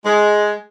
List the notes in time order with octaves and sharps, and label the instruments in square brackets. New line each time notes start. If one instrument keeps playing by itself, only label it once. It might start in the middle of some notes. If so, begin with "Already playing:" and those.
[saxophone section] G#3